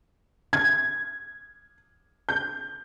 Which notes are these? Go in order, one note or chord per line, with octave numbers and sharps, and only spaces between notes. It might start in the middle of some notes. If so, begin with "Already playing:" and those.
G#6
G6